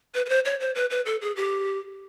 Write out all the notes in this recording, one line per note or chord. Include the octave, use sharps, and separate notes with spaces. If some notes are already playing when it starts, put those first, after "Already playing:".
B4
B4
C5
C#5
C5
B4
B4
A4
G#4
G4